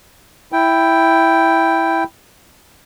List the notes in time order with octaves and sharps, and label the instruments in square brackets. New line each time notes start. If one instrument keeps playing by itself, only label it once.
[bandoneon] E4 G5